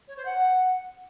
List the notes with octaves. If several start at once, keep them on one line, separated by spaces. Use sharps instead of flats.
C#5
C5
F#5